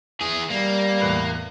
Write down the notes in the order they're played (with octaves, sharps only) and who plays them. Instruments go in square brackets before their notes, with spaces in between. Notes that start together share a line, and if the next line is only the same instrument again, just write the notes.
[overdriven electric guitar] E3 G#4
[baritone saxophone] G3 [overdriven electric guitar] A#3
[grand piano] E2 A2 B4